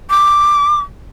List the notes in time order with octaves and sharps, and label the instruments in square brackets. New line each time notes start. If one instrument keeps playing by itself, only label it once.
[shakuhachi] D6